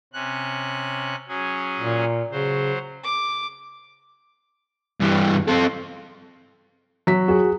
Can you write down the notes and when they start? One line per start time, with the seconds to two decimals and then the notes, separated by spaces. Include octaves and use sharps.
0.13 C3 C#4 F#6
1.28 F#3 C#4 G#4
1.80 A#2
2.32 C#3 F#3 C5
3.04 D6
5.00 G2 E3
5.48 C4 A4
7.07 F#3 B6
7.28 F#4 G#4